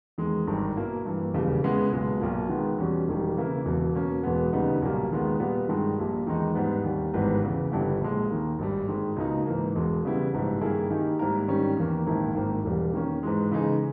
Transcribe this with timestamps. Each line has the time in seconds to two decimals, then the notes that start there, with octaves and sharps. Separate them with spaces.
0.18 E2 D#3 G#3
0.47 G#1 G2 D#3
0.76 B2 A#3 E4
1.05 G2 E3 A#3
1.34 E1 D#2 C#3 E3 G3
1.63 C#3 G#3 B3 E4
1.92 B1 A#2 G#3 B3
2.21 B1 A#2 A#3
2.49 D#3 G#3 B3
2.78 E2 B2 G3 C#4
3.08 E1 E2 D#3 G3
3.37 C#3 E3 A#3 E4
3.65 E1 E2 B2
3.95 B2 A#3 C#4
4.23 E1 E2 B2 G#3 B3
4.53 D#2 C#3 G3 B3 D#4
4.82 B1 A#2 G3 A#3
5.11 D#2 D#3 G#3 B3
5.40 A#2 G3 B3
5.69 G2 D#3 G#3
5.98 A#1 A#2 G3
6.27 E2 D#3 G#3 D#4
6.55 G#2 G3 B3
6.84 D#2 D#3 G3
7.14 G#1 G#2 E3 G3 B3
7.43 E2 C#3 E3
7.71 G1 G2 G3 B3 E4
8.01 A#1 A#2 G#3
8.30 D#2 D#3 A#3
8.59 G#1 G2 G3
8.88 G#2 D#3 G#3
9.16 C#2 B2 A#3 D#4
9.46 G#2 E3 A#3
9.75 E1 E2 B2 G#3
10.04 E2 C#3 G3 B3 E4
10.32 A#1 G#2 G3 B3
10.61 G2 D#3 A#3 E4 G#4
10.90 D#3 A#3 D#4 G4
11.19 G#2 G3 A#3 E4 A#4
11.48 G#2 D#3 G3 C#4
11.77 E2 D#3 A#3
12.06 A#1 G#2 D#3 A#3 E4
12.35 G#1 G#2 D#3 A#3
12.64 E1 E2 B2 G3
12.94 D#3 A#3 C#4
13.23 G#2 E3 G#3
13.52 C#3 E3 G#3 D#4 G#4